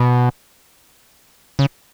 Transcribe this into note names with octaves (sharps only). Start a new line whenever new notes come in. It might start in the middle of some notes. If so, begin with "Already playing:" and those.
Already playing: B2
C#3